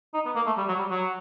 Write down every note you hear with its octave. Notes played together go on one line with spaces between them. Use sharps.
D#4
B3
A#3
A3
G3
F#3
G3
F#3